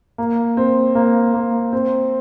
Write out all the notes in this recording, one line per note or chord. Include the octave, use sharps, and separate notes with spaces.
A#3
C4
A#3
A#3
C4